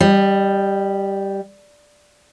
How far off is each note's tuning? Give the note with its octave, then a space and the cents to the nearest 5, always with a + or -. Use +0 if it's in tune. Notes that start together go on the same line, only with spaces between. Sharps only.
G3 +0 D#5 -30